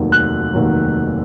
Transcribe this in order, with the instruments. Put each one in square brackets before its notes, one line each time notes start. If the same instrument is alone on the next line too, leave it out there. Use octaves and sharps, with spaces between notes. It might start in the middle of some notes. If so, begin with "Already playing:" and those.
Already playing: [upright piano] F1 D#2 D#3 F#3
F#6
F1 D#2 D#3 F#3